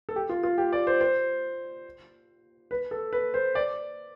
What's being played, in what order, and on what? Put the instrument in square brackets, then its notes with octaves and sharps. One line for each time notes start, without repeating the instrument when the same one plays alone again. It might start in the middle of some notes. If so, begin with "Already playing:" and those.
[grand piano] A4
G4
F4
F4
G4
D5
C5
C5
B4
A4
B4
C5
D5